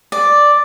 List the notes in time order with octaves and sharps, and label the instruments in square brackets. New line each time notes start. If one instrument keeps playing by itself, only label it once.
[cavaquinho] D5